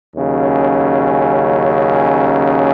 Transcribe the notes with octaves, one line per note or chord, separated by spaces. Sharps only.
D#2 C#3 F#3 C#4